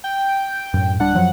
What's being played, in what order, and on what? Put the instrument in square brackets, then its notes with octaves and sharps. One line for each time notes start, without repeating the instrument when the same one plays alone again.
[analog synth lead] G5
[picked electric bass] F#2 A2
[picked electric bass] D1 G3 D4 [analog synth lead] F#5
[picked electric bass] F#2 F3 F#3